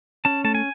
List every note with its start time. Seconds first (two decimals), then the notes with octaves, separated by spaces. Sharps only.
0.25 C#4 A5
0.44 A3 A5
0.55 G#5